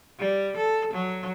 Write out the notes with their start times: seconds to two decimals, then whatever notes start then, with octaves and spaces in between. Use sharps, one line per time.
0.19 G3
0.57 A4
0.93 F#3